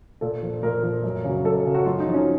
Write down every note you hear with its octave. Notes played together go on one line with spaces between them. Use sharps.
A#2 A4
F3
A#2 A#4
F3
F#2
C#3 F#3
F#2 A4
C#3 F#3
F#4
F#2 F4
D#4
F3
C#4